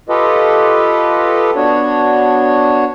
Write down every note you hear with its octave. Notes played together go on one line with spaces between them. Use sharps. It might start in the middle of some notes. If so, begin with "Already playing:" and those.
F4 G4 A4 B4 D#5
B3 D4 F#4 C#5